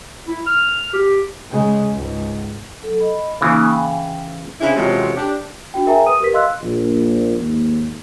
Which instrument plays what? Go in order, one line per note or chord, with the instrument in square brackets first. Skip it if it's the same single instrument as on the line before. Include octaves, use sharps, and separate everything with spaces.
[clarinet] E4
F6
G4
[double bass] C#3 G#3
C#2 G#2
[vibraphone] F#3 A4
D#5 B5
[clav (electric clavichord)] C#3 E3 [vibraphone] A#3 D#4
[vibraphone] G5
[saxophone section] C#3 C4 D4 E4
F2 C3 E3 F#3 G#3 C#4
D4 G4
[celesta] D4 F#4 G5
G#4 A#4 E5 G5 G#5 A#5
B4 D#6 D#7
G4 A#4 B4 B6
D#5 F5 C6 E6 F#6
[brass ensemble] A#1
D#2 G#2 A#3